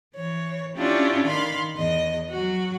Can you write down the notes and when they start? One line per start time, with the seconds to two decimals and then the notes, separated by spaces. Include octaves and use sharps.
0.15 E3 C#5
0.77 C#4 D4 E4 F4 G4
1.26 D#3 F5 B5 C6
1.76 E2 D#5
2.30 F#3 F#4